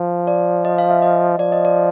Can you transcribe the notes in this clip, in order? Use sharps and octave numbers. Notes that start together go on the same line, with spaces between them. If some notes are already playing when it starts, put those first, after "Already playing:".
Already playing: F3
D5
D#5
F5
E5
D#5
F3 D5
D#5
D5